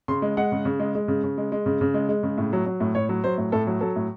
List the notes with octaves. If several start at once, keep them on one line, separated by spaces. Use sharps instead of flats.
C#3 C6
G#3
G#3 F#5
C#3
C#3
G#3
G#3
C#3
C#3
G#3
G#3
C#3
C#3
G#3
G#3
C#3
A2
F#3
F#3
A2
A2 C#5
F#3
F#3 C5
A2
A2 A4
F#3
F#3 A4
A2